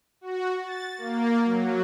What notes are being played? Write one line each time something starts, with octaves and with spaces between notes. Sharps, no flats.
F#4
A6
A#3
F#3